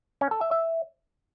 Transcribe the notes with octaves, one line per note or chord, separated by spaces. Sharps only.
C#4
A4
E5
E5